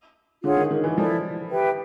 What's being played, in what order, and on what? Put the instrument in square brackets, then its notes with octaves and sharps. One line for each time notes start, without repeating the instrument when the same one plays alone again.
[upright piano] D3 [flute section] F4 G#4 C#5 F#5
[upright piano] D#3
D#3
E3
[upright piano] F3 [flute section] E4 A4 D5
[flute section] G4 B4 E5 G5